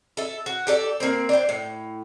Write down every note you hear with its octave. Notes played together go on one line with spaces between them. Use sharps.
A4 E5
F#4
G4 A4 D5
A#3 C4
D4 C5 G5
A2